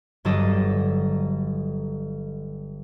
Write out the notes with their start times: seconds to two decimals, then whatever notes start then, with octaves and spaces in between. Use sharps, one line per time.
0.25 G1 G2 F#3 A4 D5 D#5